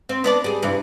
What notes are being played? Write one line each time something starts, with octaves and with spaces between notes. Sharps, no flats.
C4
B3 D4 D5
G3 G#4
G2 C3 E3